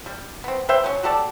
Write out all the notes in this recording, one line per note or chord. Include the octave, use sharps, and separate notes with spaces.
G3
B3 C4
B4 C5 E5 G5
F#3 C#4
F#4 G4 A4 D5